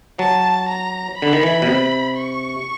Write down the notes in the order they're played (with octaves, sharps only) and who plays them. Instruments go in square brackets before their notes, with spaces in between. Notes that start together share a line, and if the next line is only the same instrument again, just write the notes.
[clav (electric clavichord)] F#3 [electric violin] A5
[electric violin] A#5
[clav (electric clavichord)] D3 [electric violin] B5
[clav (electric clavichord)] D#3
E3
B2
C3
[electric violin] C#6